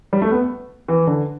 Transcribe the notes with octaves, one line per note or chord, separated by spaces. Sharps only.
G3
A3
B3
E3
D3